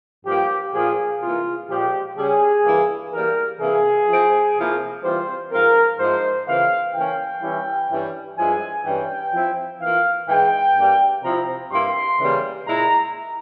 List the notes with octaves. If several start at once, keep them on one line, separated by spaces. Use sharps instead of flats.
G2 F3 A#3 G4
A#2 F3 A#3 F4 G#4
C3 E3 A#3 F4
A#2 F3 G#3 G4
C#3 G3 C#4 G#4
G2 E3 A#3 E4
E3 G3 A#3 A#4
C3 E3 A#3 E4 G#4
F3 C4 E4
C3 F3 A#3 E4
E3 G3 C4 F4 C5
G#2 F3 C4 F4 A#4
G#2 F3 G#3 E4 C5
C#3 E3 A#3 F4 F5
E3 A#3 C#4 G5
E3 G3 C#4 E4
G2 E3 G3 C#4 E4
G2 F3 G#3 E4 G#5
G2 E3 G3 C#4 G5
F3 C4 E4
E3 A#3 F4 F5
G#2 E3 G#3 G5
G2 G3 A#3
C3 F3 C4 E4 A#5
G2 G3 A#3 E4 C6
C#3 E3 G3 A#3 C#4
A#2 G#3 E4 A#5